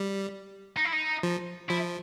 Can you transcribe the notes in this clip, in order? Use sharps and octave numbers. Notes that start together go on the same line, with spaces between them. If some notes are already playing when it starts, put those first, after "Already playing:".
Already playing: G3
D#4
E4
D#4
F3
F3 E4